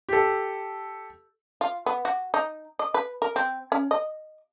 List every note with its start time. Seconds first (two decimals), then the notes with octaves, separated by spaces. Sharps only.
0.09 G4 A4
1.61 F4
1.86 B3
2.05 F#4
2.34 D#4
2.79 D#5
2.94 B4
3.22 A#4
3.36 C4
3.72 C#4
3.91 D#5